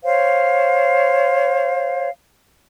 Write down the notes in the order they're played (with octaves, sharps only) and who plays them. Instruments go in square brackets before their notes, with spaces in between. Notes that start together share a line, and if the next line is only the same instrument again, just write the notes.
[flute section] C5 C#5 F5